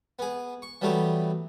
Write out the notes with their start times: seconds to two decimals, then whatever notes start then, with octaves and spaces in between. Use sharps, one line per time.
0.19 B3 G#4
0.62 C#6
0.81 E3 F#3 G3 A3 B3 G4